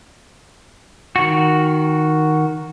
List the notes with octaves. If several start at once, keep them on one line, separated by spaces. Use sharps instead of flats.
D#3 F#4